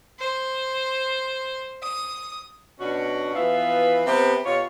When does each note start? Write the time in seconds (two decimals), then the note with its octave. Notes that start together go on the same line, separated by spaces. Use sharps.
0.19 C5
1.82 D#6
2.80 B2 B3 C#4 D4 F#4
3.35 E3 F3 B3 B4 E5 F5
4.07 C3 B3 C4 G4
4.46 B2 F4 G4 C#5